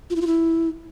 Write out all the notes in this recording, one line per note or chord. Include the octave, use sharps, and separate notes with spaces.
F4
E4
F4
E4